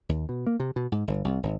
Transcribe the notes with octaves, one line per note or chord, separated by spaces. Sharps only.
D#2
B2
A#3
C3
B2
G#2
G1
C2
G#1